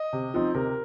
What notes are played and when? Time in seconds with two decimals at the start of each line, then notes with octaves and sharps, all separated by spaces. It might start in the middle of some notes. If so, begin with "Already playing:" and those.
Already playing: D#5
0.13 C3
0.34 F3 C4 D#4
0.55 C3 A#4